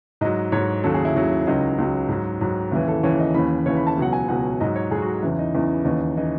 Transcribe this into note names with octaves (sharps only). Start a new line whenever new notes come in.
G#2 F#3 D#5
G#2 F#3 C#5
D#2 C#3 F#3 A4
G#4
E4
D#2 C#3 F#3
C#2 C#3 F#3 D#4
C#2 C#3 F#3
G#2 F#3
G#2 F#3
D#2 C#3 E3 E4
A4
D#2 C#3 E3 C#5
D#5
D#2 C#3 E3 B5
D#2 C#3 E3 C#5
B5
A5
C#2 B2 F#3 F#5
G#5
C#2 B2 F#3 F#5
G#2 F#3 D#5
C#5
G#2 F#3 G#4
F#4
E2 C#3 E3 E4
D#4
E2 C#3 E3 C#4
D#2 C#3 E3 D#4
D#4
C#3 E3 D#4